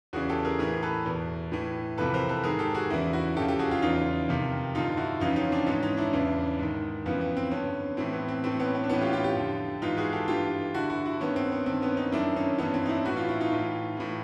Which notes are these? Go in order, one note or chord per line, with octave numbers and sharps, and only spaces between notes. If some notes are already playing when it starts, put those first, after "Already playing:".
E2 C#3 E3 F#4 G#4
G4 A4
G#4 A#4
A2 E3 G#4 A#4
A4 B4
E2 B2
A2 E3
F2 C3 E3 A4 B4
A#4 C5
A4 B4
G#2 D#3 G#4 A#4
G4 A4
F#4 G#4
E2 C#3 E3 E4 F#4
E4 F#4
F2 C#3 E3 G4 A4
G4 A4
F#4 G#4
F4 G4
E2 C#3 E3 D#4 F4
F2 C3 D#3
G2 D3 D#4 F4
E4 F#4
F2 C#3 E3 D#4 F4
C#4 D#4
C4 D4
G#2 E3 C#4 D#4
C#4 D#4
D4 E4
E2 C#3 E3
G#2 D#3
F2 C#3 E3 B3
B3
C4
G2 D3 B3 C#4
A2 E3 C4
B3
C4
A2 E3 C4
B3 C#4
B3 C#4
D4
A2 E3 B3 C#4
F4 G4
F4 G4
F4 G4
F2 D3
G#2 E3 D#4 F4
F#4 G#4
G4 A4
G2 E3 F4 G4
G2 D3 E4 F#4
E4 F#4
E4 F#4
G2 D#3 B3 C#4
C4
B3
G2 D#3 C4
B3 C#4
C#4 D#4
F#2 D#3 D4 E4
C#4 D#4
G2 E3 B3 C#4
C4
D#4
D4 E4
A2 E3 F#4
F4
E4
D#4 F4
A2 E3
A2 E3